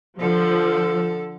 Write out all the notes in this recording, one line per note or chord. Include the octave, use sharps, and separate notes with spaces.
D3 F3 A4